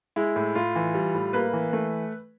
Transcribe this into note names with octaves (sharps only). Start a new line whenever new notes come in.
G#3 E4
A2
A2 F4
E3
G3
A2
A#3 B4
E3
A3